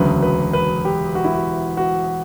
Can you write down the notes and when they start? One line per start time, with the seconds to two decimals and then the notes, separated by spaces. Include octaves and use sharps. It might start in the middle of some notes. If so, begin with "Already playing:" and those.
Already playing: E1 D2 C#3 F#3 B4
0.23 B4
0.53 B4
0.85 G4
1.15 F#4
1.25 E4
1.33 F#4
1.77 F#4